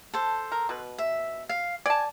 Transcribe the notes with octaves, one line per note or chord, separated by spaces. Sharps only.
A4 C5
A#4
B2 B4
E5
F5
D5 G#5 A5